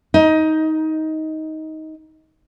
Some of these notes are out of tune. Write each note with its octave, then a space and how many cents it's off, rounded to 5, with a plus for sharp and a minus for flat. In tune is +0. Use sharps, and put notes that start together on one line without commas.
D#4 +15